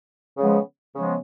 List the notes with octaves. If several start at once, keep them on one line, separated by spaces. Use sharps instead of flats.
C#3 F3 G#3 B3
C#3 F3 G#3 B3